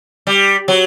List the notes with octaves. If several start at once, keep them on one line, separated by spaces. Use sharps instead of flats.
G3
F#3